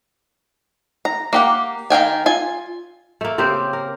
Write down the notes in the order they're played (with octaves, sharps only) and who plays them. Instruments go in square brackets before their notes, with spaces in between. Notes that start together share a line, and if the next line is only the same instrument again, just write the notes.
[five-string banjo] A#5
A#3 G4 F#5
D#3 F5 G5 G#5
F4 G#5
[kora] A3 A#3
C#3 A#3 C4 G4
A#4